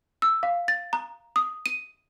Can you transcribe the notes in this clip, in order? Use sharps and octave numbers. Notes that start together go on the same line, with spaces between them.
E6
F5
A6
A#5
D#6
D#7